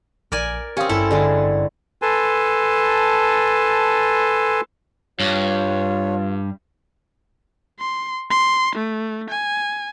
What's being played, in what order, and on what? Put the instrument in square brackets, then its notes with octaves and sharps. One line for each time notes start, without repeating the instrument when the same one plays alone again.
[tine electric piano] A#1 [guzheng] A#4 D5 G#5
[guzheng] C4 C#4 [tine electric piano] G4 F5 D#6
[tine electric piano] G#1 G2 C6 [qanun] E4 [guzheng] A4
[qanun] D3 G#3 E4
[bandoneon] A4 B4 G#5 A5 C6
[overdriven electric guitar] G2 [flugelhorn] F4 [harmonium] C#5
[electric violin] C6
C6
A3
G#5